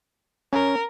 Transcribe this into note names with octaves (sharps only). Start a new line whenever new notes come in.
C#4 A#4